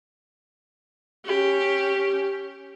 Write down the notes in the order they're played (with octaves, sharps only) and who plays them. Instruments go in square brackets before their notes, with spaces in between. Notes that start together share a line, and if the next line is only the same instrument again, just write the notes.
[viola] C#4 G4